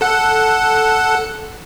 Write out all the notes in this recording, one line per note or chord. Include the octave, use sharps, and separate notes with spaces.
A4 F#5